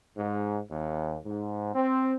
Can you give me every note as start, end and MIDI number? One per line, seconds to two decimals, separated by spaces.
0.17 0.60 44
0.71 1.17 39
1.25 1.75 44
1.75 2.16 60